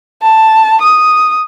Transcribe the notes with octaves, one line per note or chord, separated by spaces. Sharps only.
A5
D#6